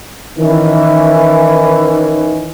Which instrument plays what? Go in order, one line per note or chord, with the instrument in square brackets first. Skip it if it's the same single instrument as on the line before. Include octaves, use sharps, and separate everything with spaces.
[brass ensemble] D#3 E3 C#4